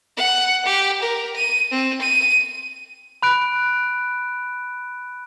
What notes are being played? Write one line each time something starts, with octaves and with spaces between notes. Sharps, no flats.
F#5
G4
A#4
D#7
C4
D#7
B5 F#6 D7